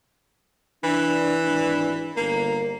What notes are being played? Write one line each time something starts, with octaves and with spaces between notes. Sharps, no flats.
E3 D4
G#1 D4
G1 A#3 A#4